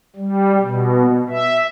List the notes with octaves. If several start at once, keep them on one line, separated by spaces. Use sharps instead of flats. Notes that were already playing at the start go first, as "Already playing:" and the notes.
G3
B2
E5